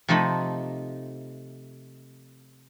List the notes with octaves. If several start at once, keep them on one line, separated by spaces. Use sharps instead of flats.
C3 F3 A3 D#4 D#5 B5